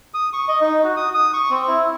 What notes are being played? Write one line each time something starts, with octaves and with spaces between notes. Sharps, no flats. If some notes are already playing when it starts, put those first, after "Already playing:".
D#6
C#6
D#5
D#4
F#4
D#6
D#6
C#6
C4
E4